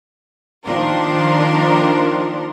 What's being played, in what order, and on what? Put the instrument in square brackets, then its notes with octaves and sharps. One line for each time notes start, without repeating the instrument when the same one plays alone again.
[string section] D#3 F3 A#3 D4 A#4 C6